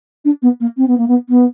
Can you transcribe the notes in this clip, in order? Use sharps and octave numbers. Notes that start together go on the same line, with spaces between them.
D4
B3
A#3
C4
B3
A#3
B3
B3